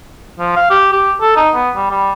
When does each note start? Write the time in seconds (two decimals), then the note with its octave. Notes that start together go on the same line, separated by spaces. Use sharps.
0.39 F3
0.56 F5
0.70 G4
0.93 G4
1.21 A4
1.36 D#4
1.55 B3
1.76 G3
1.90 G3